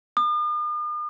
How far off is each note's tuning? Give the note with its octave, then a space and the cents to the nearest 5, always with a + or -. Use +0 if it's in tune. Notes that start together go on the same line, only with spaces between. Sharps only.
D#6 -45